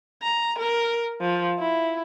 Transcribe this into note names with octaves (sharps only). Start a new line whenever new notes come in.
A#5
A#4
F3
E4